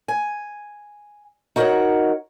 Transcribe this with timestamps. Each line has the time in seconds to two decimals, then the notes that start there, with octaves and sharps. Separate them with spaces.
0.08 G#5
1.56 D#4 F#4 A#4 B4 C#5 F#5